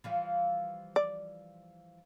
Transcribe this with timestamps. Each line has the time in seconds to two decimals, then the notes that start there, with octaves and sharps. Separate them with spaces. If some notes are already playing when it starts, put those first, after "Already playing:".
0.04 E3 F3 G3
0.96 D5